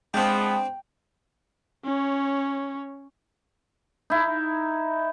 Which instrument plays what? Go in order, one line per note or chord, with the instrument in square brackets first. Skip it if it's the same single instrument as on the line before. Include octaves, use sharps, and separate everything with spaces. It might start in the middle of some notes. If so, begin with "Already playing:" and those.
[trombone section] F3 B3 [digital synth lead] G#3 [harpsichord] C4 D4 [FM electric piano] G5
[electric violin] C#4 C#5
[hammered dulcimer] D#4 E4